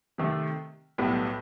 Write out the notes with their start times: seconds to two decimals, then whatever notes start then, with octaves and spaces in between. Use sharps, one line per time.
0.18 C3 D#3 A3
0.98 B1 A2 G3 B3